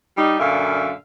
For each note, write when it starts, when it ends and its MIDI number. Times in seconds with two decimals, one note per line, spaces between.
0.17 0.37 55
0.17 0.37 63
0.39 0.92 42
0.39 0.92 46
0.39 0.92 50
0.39 0.92 76
0.39 0.92 77